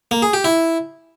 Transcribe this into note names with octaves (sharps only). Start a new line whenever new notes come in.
A#3
G#4
G4
E4